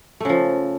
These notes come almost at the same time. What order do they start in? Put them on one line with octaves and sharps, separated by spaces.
A3 C#3 F3